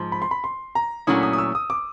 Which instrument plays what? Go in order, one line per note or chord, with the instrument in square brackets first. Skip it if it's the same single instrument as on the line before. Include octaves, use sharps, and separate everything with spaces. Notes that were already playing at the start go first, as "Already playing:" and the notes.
Already playing: [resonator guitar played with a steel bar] G#2 F3
[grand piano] B5
C6
B5
C6
A#5
[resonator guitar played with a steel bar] A#2 F#3 A3 C#4 E4 [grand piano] D#6
[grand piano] D#6
D#6
E6
D#6
D6